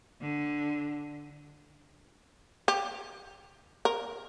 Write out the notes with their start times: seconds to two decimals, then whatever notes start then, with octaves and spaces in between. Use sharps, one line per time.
0.21 D3
2.68 G4
3.85 A#4